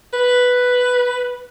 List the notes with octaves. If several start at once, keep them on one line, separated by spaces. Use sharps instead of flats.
B4